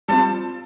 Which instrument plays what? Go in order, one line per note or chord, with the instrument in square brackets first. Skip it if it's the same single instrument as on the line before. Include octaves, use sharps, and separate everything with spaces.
[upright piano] G3 C4 F4 [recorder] A5